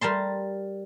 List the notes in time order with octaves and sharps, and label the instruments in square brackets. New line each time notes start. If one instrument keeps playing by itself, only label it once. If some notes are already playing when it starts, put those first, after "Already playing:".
[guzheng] G3 A#4 A5 C6